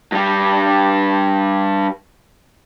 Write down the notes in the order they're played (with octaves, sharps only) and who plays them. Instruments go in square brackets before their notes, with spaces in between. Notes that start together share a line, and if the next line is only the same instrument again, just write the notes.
[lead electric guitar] G2 G3